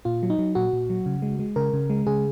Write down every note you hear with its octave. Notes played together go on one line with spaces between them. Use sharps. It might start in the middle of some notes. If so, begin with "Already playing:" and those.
A#2 F4
F#3
D#4
F#3
A#2 F#4
A#2
F#3
C#3
G#3
G#3
C#3 A#4
C#3
G#3
C#3 G#4